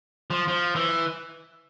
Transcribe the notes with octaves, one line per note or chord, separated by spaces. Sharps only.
F3
F3
E3